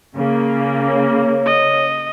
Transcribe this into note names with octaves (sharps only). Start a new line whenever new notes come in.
C#3 A#3
C#5
D#5